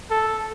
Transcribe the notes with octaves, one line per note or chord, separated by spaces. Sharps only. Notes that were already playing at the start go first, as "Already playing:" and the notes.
A4